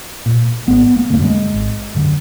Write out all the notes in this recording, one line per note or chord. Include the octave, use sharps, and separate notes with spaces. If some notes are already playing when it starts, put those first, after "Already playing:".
A#2
G#1 B3
A#3
F#2 D3 A#3
G#3
G#1
F#2 D3